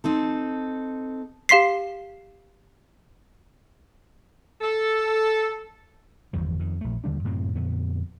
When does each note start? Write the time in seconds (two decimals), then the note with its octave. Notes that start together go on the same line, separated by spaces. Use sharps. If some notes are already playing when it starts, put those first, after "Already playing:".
0.04 C4 D#4 A4
1.49 G4 F5 C6 B6 C7
4.61 A4
6.33 G1 E2 D#3 F3
6.59 F2 D#3
6.81 A#1 A3
7.04 D#2 D3 G3 D4
7.24 F#2 A2 C3 C4
7.55 F2 A#2 D3 B3